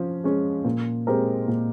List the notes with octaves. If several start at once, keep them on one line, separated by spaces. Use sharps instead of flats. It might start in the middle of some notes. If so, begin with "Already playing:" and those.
Already playing: F3 C#4
G#3 C#4
A#2
G#3 C4 G4 A#4
A#2